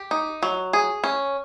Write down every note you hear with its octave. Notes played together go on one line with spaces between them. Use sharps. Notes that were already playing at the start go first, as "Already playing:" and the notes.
Already playing: G4
D#4
F#3
G#4
C#4